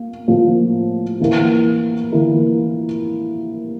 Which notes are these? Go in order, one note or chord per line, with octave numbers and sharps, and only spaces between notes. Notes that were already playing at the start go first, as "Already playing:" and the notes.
Already playing: A#3
A2 F3 A#3
E3 A#3 E4 A#4
E3 A#3 E4 A#4